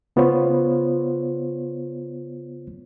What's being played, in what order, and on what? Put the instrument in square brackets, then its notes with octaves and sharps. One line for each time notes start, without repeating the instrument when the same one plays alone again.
[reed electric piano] C#3 B3 F4 C5 C#5